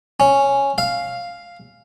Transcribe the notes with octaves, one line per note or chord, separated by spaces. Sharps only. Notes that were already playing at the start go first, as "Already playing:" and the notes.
C#4
F5